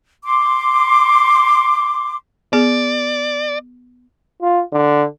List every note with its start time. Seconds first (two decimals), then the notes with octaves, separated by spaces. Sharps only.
0.24 C6 D6
2.53 B3 G#4 D5
4.42 F4
4.72 D3